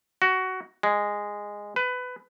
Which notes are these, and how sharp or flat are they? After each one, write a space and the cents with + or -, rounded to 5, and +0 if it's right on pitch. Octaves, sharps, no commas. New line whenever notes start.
F#4 +15
G#3 -10
B4 +20